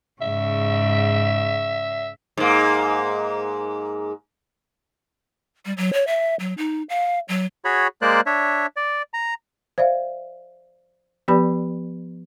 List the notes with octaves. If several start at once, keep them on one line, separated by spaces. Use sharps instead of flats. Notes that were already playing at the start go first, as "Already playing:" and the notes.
G#2 C#3 E5
G#2 A#3
G3
F#3
C#5
E5
F#3
D#4
F5
F#3
F#4 G#4 C#5 B5
G#3 A#3 A#4 C5 D5 F#6
D4 C#5 E5
D5
A#5
C5 D5 E5 F5
F3 B3 G4 B4 D5 B5